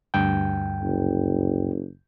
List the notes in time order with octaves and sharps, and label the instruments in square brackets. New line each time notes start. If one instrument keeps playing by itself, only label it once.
[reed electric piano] D2 G2 G5
[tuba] F#1